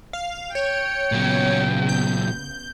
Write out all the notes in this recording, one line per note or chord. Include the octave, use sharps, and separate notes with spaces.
F5
C#5 G5
A#2 C#3 F#3 B3
G6